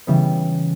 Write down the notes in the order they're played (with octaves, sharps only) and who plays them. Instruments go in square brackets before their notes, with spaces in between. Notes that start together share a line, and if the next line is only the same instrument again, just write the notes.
[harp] C#3 E3 G3 B3